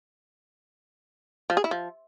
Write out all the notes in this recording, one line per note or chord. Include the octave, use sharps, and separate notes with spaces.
F3
G#4
E4
F3